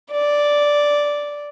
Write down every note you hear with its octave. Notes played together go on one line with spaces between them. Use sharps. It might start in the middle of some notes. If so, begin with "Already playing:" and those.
D5